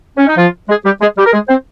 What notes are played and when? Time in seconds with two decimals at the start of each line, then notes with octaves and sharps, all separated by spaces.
0.17 C#4
0.27 D#4
0.37 F3 F4
0.69 G#3 G#4
0.85 G3 G4
1.01 G#3 G#4
1.17 G3 G4
1.26 A#4
1.33 G#3 G#4
1.49 C4 C5